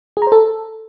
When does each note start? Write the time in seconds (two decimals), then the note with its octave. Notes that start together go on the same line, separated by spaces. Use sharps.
0.17 G#4
0.22 A#5
0.27 C5
0.32 A4